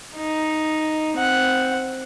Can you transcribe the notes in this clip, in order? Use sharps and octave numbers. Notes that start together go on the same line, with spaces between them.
D#4
C4 F#5